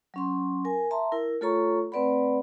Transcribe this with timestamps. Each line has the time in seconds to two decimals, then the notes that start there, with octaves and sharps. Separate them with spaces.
0.14 F#3 C#4 C6
0.65 A#4 G#5
0.91 E5 A5 A#5 C6
1.12 E4 A#4
1.41 A3 F4 A4 C#5 A#5 C#6
1.92 A3 C4 B4 D5 F#5 B5